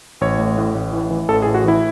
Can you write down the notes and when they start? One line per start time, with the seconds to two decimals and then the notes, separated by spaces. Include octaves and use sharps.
0.21 A1 C#5
0.39 A2
0.58 A2
0.75 A1
0.93 E3
1.11 E3
1.28 A1 A4
1.42 G#4
1.46 A2
1.54 F#4
1.64 E3 E4